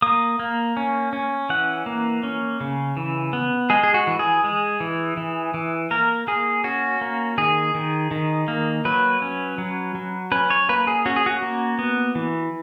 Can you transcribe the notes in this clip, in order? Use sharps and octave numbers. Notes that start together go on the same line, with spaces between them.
A#3 D#6
A#3
C#4
C#4
E3 F#5
A#3
C#4
C#3
E3
B3
G#3 G#4
G#4
F#4
E3
G#4
G#3
E3
E3
E3
A#3 A#4
A#3 G#4
C#4 F#4
A#3
D#3 G#4
D#3
D#3
A#3
F#3 B4
C#4
F#3
F#3
C#4 B4
C#5
A#3 B4
G#4
C#4 F#4
G#4
F#4
A#3
B3
E3